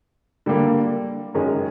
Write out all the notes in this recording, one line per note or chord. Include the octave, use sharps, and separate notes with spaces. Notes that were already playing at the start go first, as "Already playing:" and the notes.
D3 G3 A#3
F#2 D#3 G#3 C#4